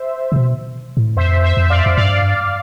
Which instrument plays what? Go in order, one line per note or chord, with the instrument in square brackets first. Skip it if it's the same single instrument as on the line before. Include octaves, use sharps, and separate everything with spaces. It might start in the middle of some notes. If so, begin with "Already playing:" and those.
Already playing: [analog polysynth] C5 E5
[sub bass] C3
B2
A2
[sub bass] F2 [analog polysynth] C5 E5
[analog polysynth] C5 E5
[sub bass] F2
[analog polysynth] E5
D5 F5
[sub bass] F2
[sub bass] G2 [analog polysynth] D5 F5